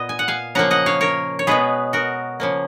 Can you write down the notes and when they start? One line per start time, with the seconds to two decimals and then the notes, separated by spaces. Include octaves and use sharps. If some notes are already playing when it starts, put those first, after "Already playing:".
Already playing: A#2 B3 D#5
0.09 G#5
0.19 F#5
0.28 F5 G#5
0.55 C#3 F3 A#3 F#5 A#5
0.71 D#5 F#5
0.86 C#5 F5
1.01 A#4 C#5
1.39 C#5
1.47 B2 G#3 B3 G#4 B4
1.93 F#4 A#4
2.40 C#3 F3 A#3